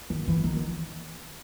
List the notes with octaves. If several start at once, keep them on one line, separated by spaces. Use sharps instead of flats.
D#3
E3
D#3